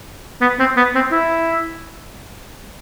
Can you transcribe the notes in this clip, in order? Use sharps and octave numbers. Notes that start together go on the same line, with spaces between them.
B3
C4
B3
C4
E4